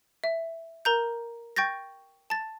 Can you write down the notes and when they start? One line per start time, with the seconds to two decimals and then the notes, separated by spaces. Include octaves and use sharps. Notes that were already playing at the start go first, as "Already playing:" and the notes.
0.24 E5
0.85 A#4 A#5 G6
1.56 G5 C#6 G6 A6 A#6
2.30 A5 A6